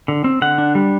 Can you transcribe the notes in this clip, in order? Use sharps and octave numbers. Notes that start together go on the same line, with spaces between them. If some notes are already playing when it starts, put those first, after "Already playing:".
D3
C4
D3 F#5
D4
G3